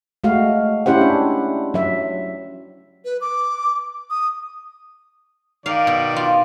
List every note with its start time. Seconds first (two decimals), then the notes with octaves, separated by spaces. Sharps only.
0.24 G#3 A3 F#4 F5
0.86 C#4 E4 G4 C5 F#5
1.01 D4
1.74 F#3 E5
3.05 B4
3.21 D6
4.10 D#6
5.66 D#3 D5 F5
5.87 B2
6.16 F4